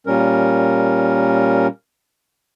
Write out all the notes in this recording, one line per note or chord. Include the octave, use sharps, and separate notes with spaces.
A#2 G3 C#4 A#4